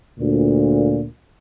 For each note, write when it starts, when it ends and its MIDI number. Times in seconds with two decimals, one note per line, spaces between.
0.19 1.04 38
0.19 1.04 46